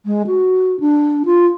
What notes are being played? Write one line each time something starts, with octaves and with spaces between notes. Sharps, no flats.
G#3
F#4
D4
F4